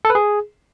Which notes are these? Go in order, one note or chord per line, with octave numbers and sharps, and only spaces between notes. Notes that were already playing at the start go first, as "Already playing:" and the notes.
A4
B4
G#4